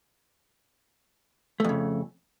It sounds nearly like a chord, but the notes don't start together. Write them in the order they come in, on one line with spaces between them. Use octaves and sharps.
A3 F2 C#3